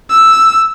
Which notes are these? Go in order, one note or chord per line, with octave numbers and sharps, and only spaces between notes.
E6